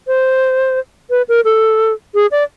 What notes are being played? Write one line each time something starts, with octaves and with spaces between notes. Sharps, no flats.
C5
B4
A#4
A4
G#4
D5